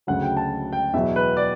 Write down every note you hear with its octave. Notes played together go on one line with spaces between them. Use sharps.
D2 C#3 F#3 F#5
G5
A5
G5
E2 B2 F#3 E5
B4
D5